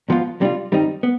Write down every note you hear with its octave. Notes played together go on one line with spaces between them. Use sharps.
G#2 F3 B3 F4
F2 C3 G3 D4 F4
G2 D#3 G3 C4 D#4
B3